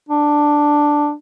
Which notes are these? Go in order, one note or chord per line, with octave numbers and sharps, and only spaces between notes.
D4